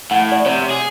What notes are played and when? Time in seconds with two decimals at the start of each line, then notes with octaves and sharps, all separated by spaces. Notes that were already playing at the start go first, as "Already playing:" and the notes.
0.11 A2 F#5
0.32 D5 E5
0.46 C3 C#5
0.71 G#4